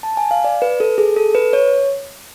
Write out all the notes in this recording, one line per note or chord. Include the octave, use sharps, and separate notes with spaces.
A5
G#5
F5
D5
B4
A4
G#4
A4
B4
C#5